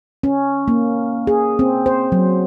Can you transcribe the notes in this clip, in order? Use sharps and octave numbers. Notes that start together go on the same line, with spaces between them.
C#4
A#3
G#4
C4
C5
F#3